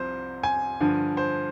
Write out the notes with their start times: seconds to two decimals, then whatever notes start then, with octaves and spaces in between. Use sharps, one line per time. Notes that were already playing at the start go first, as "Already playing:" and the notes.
Already playing: C2 C3 F3 C5
0.43 G#5
0.81 G2 D3 F3
1.17 C5